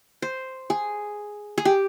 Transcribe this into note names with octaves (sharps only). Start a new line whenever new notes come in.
C5
G#4
G#4
G4